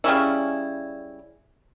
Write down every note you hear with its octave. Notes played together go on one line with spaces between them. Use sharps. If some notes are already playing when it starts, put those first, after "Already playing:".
C#3 G3 C#4 E4